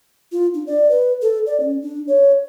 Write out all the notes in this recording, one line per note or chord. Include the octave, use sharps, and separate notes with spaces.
F4
D4
D5
B4
A4
D5
C#4
D4
C#5